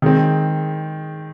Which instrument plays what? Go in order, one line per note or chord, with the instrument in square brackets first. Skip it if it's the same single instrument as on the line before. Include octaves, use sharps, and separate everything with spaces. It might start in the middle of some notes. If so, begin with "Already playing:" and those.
[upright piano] D#3 G#3 C4